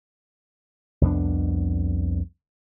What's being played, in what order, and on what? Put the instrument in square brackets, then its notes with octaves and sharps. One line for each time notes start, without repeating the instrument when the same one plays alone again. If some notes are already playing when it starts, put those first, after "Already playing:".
[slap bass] C2 F2 B3 D4